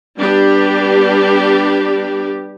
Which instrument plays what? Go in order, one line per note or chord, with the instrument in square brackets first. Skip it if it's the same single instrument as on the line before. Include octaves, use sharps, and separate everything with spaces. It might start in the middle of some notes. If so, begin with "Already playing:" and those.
[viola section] G3 B3 D4 G4